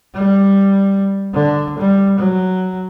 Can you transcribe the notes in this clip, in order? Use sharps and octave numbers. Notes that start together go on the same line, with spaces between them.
G3
D3
G3
F#3